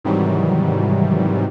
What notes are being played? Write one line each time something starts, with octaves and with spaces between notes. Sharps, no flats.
G#2 C3 D#3 E3 F#3 G3